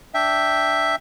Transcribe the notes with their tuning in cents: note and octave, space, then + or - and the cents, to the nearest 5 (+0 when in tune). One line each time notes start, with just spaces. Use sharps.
D4 +0 E5 +0 G5 +0